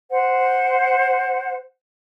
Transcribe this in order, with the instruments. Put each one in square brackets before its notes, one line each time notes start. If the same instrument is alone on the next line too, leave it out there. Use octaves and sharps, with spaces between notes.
[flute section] C5 F#5